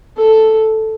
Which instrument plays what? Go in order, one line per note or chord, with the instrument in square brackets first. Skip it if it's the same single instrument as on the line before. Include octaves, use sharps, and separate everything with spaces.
[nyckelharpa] A4